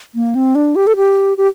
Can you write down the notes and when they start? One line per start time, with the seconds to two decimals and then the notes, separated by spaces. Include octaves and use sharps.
0.15 A#3
0.35 C4
0.55 D4
0.75 G4
0.87 A4
0.96 G4
1.37 G4